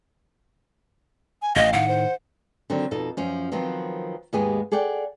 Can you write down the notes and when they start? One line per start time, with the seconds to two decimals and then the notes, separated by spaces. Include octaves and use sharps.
1.42 G#5
1.56 A1 D#5 F5
1.73 A2 D#3 F#5
1.88 C5
2.70 D3 D#3 F#3 C4
2.91 F2 B2 D#4 A4
3.17 F#2 F3 C#4
3.52 D#3 F3 F#3 B3 C4
4.33 D#2 G#2 G#3 B3 G4 G#4
4.72 G#4 A4 D5 F#5 G5